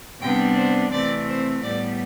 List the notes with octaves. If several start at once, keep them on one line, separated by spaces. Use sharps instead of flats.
C3 G3 B3 D4 G5
C5
C3 E3 A3 C4 D5
C5
A2 G3 B3 D5